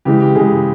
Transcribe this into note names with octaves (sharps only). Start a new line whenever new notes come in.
C#3 E3 G#3 G4
G4
C#3 E3 G#3 G#4